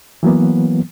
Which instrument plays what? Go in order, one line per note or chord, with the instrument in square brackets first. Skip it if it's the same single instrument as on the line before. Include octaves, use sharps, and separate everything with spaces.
[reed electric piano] E3 F#3 A#3 B3